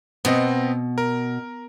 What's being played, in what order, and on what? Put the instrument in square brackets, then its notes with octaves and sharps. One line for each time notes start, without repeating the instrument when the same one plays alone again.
[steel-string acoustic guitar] B2 [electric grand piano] B3 C4 D#5
[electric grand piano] A#4